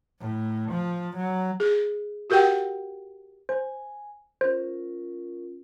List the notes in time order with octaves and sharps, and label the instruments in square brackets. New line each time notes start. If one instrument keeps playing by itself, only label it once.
[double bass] A2
F3
F#3
[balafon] G#4
F#4 G4 A#4 F#5 G5
[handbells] C5 [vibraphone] G#5
[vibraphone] C#4 F4 A#4 [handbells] C5